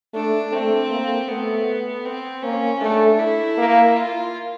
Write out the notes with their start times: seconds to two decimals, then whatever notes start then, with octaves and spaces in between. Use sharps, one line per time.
0.14 A3 D4
0.52 A3 C4
0.90 A#3
1.28 A3 B3
2.05 C4
2.43 A#3 C#4
2.81 A3 D4
3.19 E4
3.57 A#3
3.95 F4